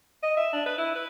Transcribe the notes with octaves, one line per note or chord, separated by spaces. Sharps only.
D#5
E5
D4
B4
E4
B4